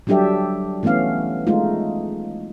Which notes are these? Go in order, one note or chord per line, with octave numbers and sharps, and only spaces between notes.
F#3 G3 D4 G4 A4 E5
E3 A3 B3 C#4 F5
G#3 A3 D#4 F4